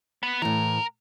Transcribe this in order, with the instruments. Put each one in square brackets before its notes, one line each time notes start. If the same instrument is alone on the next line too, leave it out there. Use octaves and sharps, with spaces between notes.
[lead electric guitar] B3
[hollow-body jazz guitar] A2 E3 [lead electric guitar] A#4